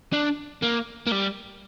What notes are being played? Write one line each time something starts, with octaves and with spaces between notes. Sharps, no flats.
D4
A#3
A#3
G3